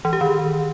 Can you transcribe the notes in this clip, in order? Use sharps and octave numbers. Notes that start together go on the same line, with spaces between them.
E3
G4
D#3